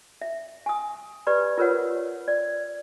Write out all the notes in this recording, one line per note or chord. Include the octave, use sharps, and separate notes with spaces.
E5
G#5 D#6
G4 B4 D5 B5
F4 A#4 B4 C#5 F#5
D5